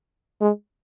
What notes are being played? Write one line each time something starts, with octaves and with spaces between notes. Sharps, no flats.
G#3